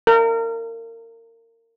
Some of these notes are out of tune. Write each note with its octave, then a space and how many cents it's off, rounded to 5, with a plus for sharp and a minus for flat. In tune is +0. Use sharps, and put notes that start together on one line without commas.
A#4 -30